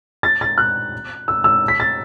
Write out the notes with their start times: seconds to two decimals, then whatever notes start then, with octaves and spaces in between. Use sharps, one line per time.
0.23 A6
0.41 A6
0.58 F#6
1.28 E6
1.44 E6
1.68 B6
1.80 A6